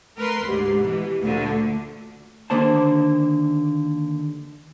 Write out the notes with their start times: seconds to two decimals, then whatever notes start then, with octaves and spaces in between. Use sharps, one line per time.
0.18 A3 A#4 B4 C6
0.47 D2 G#2 G4
0.83 B2 E3
1.23 D2 A#2 D3 A3
2.50 D#2 D3 D#3 A#3 C5 A5